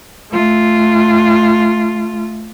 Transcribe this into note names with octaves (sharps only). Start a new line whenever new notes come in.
A3 F4